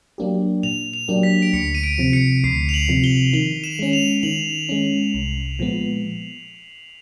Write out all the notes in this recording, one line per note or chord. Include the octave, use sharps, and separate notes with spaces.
F#3 A#3 D4 G4
A#2 F7
F7
F#3 A#3 D4 G4
B6
D7
D2 C#7
D#7
D7
C3 F3
C#7
D2 C7
F7
F#7
C3 F3
G7
D#3 F#7
E7
G#3 C#4
F7
D#3 F#7
G#3 C#4
C2
A#2 F3 G#3 B3